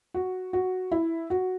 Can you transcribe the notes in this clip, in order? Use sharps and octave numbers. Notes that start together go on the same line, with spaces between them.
F#4
F#4
E4
F#4